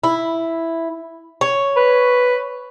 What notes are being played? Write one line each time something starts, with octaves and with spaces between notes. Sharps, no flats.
E4
C#5
B4